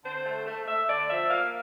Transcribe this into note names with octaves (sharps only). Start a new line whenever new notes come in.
D3 C5
A3
A3
A3 E5
D3 D5
F3 E5
A#3 F5